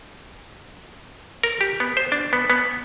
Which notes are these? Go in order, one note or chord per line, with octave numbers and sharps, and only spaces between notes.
A#4
G4
B3
C5
D4
B3
B3